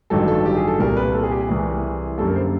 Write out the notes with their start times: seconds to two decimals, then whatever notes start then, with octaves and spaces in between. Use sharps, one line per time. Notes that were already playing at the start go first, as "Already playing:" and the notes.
0.10 A1 G2 D#3 F#3 A4
0.28 A4
0.46 G4
0.57 G#4
0.68 A4
0.79 C2 A#2 G3 A#4
0.97 B4
1.14 A4
1.23 G#4
1.31 G4
1.40 G#4
1.49 C2 C3 E3
2.18 F#2 D3 G3 A#3 A4
2.27 A#4
2.35 C5